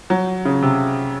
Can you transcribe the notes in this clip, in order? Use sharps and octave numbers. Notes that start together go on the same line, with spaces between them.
F#3
C#3
C3